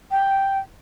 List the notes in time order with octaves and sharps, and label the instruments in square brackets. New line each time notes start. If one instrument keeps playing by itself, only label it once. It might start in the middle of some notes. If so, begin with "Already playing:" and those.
[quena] G5